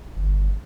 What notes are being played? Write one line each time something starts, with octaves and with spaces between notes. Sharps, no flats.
G1